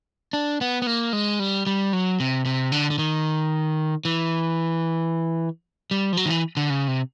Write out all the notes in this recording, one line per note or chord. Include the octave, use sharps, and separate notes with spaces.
D4
B3
B3
A#3
G#3
G3
G3
F#3
C3
C3
D3
D3
D#3
E3
G3
F3
F#3
D#3
E3
D3
C#3
C3